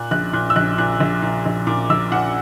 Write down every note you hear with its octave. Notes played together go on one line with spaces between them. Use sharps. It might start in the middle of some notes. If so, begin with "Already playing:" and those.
Already playing: A#2 F#6
A#1 F#6
A#2 F#6
E6
A#1 F#6
A#2 F#6
A#1
A#2
A#1
A#2 D6
A#1 E6
A#2 F#5